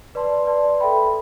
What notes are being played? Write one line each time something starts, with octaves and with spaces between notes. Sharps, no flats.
B4 D5 A5 C6
B4 D5 A5 C6
A4 E5 G5 B5